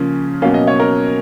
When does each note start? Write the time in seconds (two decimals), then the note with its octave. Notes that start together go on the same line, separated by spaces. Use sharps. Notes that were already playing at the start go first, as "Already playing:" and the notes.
Already playing: C#3 F3 A#3 C#4
0.42 B2 F#3 A#3 C#4 F5
0.54 D#5
0.67 C#5
0.80 A#4